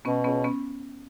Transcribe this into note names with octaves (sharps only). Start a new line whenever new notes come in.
B2 B3 C#4
C#2 B3 C#4
B3 C#4